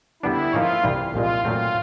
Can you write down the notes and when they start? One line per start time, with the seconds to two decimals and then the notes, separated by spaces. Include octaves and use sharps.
0.22 D3 G3 B3 D4 E4
0.53 F3 A#3 D#4 F4 G#4 C#5
0.83 C2 C3 E3 G3
1.14 C2 A#2 F3 G#3 F4
1.44 A#2 F#3 A3 C4 F4